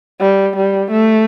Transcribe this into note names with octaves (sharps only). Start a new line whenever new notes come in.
G3
G3
A3